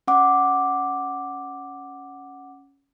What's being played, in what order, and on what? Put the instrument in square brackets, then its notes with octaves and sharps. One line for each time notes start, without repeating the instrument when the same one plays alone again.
[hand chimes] C#4 F#5 D6